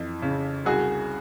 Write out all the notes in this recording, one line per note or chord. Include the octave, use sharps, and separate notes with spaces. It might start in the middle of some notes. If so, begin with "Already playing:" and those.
Already playing: F2 E3
C#3
C2 F#4 G#4